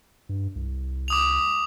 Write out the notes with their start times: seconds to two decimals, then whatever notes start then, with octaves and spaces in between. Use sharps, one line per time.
0.29 G2
0.55 C2
1.08 D6 D#6 F7